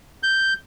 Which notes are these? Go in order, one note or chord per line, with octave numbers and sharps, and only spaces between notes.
G6